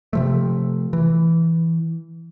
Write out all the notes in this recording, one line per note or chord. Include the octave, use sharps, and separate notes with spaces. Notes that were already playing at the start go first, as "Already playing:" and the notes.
C3 F3 A3
E3